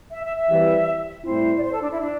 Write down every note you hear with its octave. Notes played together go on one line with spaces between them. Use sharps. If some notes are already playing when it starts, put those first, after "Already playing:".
E5
E5
E5
E3 G3 C4 G4 B4
A2 G3 C4 E4 C5
D5
C5
A4
D4
E4
D4